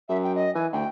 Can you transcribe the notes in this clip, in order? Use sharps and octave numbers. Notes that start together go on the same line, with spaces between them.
F#2 E5
G5
D#5
E3 G#5
D2 G5